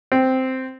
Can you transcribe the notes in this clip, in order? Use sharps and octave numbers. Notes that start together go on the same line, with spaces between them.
C4